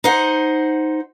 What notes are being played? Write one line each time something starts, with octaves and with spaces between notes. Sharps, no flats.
D#4 C5 F#5